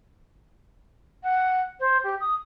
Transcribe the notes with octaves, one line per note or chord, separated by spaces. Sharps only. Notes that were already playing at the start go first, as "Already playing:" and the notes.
F#5
C5
G4
D#6